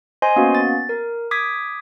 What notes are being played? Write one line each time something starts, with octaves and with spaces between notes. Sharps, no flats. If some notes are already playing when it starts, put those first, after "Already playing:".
C5 D#5 G#5 C6
A#3 B3 C#4 F#4
A6
A#4
D6 D#6 G#6 B6